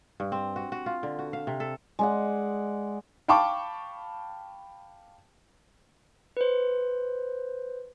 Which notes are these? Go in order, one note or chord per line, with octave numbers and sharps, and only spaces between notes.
G2
C4
F#4
F#4
F4
D3
F#4
F5
C3
A4
G#3 D5 F#5
F5 G5 A5 B5 C#6 D6
B4 C5